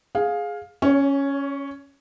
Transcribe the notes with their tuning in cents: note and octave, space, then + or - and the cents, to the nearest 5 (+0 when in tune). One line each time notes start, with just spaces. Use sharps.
G#4 +0 F5 +15
C#4 +0 C#5 +35